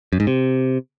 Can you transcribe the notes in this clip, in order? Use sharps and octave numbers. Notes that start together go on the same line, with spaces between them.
F#2
G#2
C3